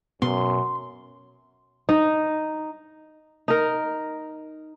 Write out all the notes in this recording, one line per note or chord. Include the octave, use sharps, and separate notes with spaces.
F#2 B2 B3 C6
D#4
D#4 A#4